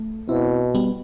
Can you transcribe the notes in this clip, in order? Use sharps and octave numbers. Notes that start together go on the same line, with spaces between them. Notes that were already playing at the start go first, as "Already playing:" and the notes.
Already playing: A3
B2 C4 E4
G3 B3